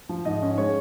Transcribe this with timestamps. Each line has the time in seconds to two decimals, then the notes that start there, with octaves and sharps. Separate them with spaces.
0.09 F3
0.25 G#2 D#5
0.42 C#4
0.58 G#3 C#5